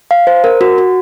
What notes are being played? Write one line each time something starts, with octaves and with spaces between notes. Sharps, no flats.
F5
C5
A#4
F#4
F#4